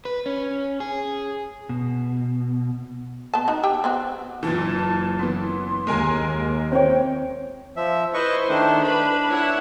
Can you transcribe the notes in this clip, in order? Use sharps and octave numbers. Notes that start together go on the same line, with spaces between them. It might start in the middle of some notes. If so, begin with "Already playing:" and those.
B4
C#4
G#4
B2
B3 A5
D#4 F#4
G4 G5
B3 C4 F#4
F#1 A#2 E3 A5
E3 B3 C6
D#2 G#3 A#4 G#5
C4 C#5 G5
F3 E5
E4 B4 C5 D#5 C#6
D#3 A3 D4
D4 B4 B5
E4 C#5 F#5